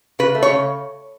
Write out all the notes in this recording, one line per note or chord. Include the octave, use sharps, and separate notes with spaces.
C#3 B4
A3
C#5
C#3